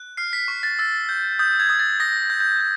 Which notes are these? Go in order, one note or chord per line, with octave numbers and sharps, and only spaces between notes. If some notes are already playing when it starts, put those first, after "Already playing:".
Already playing: F#6
F6 C7
B6
C#6
A6
E6 A6
G6
D#6 G6
G#6
D#6
A6
D#6 A#6
G6
G6
G6